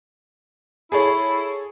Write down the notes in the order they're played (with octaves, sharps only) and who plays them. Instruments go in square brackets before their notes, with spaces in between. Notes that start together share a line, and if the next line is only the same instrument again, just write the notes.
[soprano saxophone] E4 [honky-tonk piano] G#4 A4 C#5